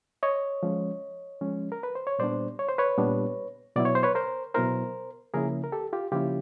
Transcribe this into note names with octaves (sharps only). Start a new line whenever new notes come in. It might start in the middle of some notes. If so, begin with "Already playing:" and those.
C#5 D#5
F3 G#3 C#4
F3 G#3 C#4
A#4
B4
C5
C#5
A#2 G3 B3 D4 C5 D5
C#5
C5
B4 C#5
A#2 G3 B3 D4
B2 F#3 B3 E4 D5
C#5
C5
B4 C#5
A#4 C5
B2 F#3 B3 E4 A#4 C5
C#3 F3 A#3 C#4 E4 G#4 A#4
A#4
G4 A4
F4 G4
C#3 F3 A#3 C#4 E4 F4 G4